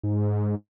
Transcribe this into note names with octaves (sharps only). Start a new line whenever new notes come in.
G#2